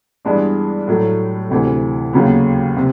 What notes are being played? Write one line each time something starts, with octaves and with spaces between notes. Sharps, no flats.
G2 E3 G#3 B3 D4
A2 F#3 A3
D2 C3 E3
D#2 C#3 F#3 B3
C3